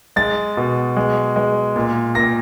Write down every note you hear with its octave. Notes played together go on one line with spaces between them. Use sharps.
G#3 A6
B2
G#3
G#3
A#2
A#2 A#6